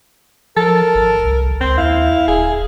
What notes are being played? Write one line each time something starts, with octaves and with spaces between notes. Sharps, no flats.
F3 A4 A#4
G#1
C2
C#2 C4
D#2 E4 F5
D1 G#4